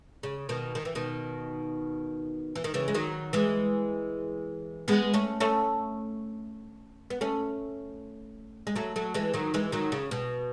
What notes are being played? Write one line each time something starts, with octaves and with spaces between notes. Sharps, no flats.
C#3
B2 D#3
D#3
E3
B2 D#3
E3
D#3
C#3 E3
G#3
D#3 F#3
E3 G#3
G#3 B3
A3 C#4
A3 C#4
B3
A3 C#4
G#3
F#3 A3
F#3 A3
E3 G#3
D#3 F#3
E3 G#3
D#3 F#3
C#3
B2